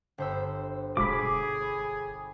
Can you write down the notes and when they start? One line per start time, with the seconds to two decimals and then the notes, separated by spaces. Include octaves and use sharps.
0.18 G1 C5 E6
0.97 E1 G#4 B5 D6